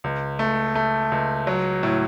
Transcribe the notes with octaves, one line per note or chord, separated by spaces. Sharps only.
C#2
A3
A3
C#2
F#3
A2